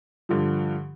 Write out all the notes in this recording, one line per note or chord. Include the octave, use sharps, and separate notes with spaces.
G2 D3 F3